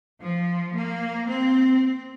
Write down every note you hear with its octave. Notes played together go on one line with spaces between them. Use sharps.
F3
A#3
C4